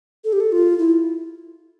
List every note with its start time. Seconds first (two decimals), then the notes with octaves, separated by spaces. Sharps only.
0.24 A4
0.33 G4
0.40 A4
0.52 F4
0.79 E4